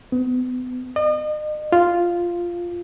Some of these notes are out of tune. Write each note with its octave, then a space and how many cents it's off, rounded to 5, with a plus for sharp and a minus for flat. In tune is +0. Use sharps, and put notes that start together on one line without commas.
B3 +35
D#5 -40
F4 -5